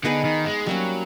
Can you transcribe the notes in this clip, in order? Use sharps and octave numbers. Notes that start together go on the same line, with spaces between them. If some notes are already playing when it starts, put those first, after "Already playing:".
D3 B3 D#4 G#4 B4
D#3
G#3
F#3 G3 A#3 C#4